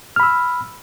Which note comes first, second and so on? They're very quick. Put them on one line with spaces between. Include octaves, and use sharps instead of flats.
F6 B5 E6